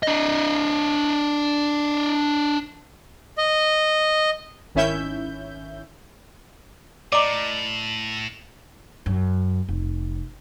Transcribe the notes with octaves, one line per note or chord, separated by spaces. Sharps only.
D4 D#5
D#5
G#1 D#3 C#4 E4 E5 G6
A2 D5 D#5 A#5 D6
F#2
F1